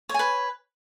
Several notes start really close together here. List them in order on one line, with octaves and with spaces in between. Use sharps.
C#5 G#5 B4